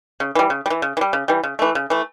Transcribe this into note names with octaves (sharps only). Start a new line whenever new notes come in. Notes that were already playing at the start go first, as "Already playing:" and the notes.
C#3
E3 G3
C#3
G3
E3
C#3
E3
G3
C#3
E3 G3
C#3
E3 A3
C#3
E3 A3